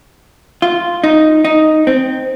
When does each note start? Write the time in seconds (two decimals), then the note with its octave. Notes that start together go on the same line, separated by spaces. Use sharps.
0.62 F4
1.04 D#4
1.45 D#4
1.87 C4